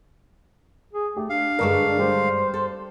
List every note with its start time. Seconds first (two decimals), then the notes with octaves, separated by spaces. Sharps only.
0.93 G#4
1.17 A3 G4
1.30 D4 F5
1.59 G2 D3 G#3 A#4 C#6
1.98 G3 G4 C5
2.54 A4